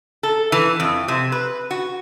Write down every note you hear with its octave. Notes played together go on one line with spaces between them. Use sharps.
A4
E3
F2
C3
B4
F#4